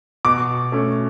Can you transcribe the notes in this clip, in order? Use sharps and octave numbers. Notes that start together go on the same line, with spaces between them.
B2 D6
A3 C#4